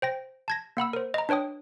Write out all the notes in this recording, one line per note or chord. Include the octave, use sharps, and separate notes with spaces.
C5 G5 A#6
A5 G#6 A#6
A#3 F#5 B5 E6
A#4 C5
D#5 A#5
D4 B4 C#5 G5 D#6